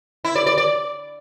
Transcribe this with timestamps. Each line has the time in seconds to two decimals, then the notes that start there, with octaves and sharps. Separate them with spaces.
0.25 E4
0.36 D5
0.47 D5
0.58 D5